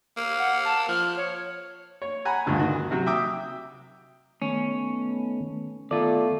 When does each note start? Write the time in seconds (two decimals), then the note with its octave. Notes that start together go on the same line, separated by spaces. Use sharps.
0.17 A#3
0.39 F#5
0.65 A5
0.89 F3 F6
1.17 C#5
2.02 C#5
2.25 F#5 G#5 A#5 B5
2.46 D2 G2 A#2 C#3 G#3
2.59 D#3 F#4
2.91 C3 F#3 F#4
3.06 E5 G5 D6 D#6
4.42 D#3 A3 B3 C#4
5.91 D#3 A3 B3 F4 D5